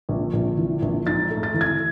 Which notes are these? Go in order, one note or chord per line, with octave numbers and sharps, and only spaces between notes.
A#1
A#1
E3
A#1
G#2 A6
A3
A6
E3
G#6